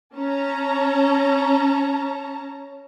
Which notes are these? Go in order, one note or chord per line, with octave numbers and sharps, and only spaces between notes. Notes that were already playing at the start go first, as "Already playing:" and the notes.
C#4 A5 A#5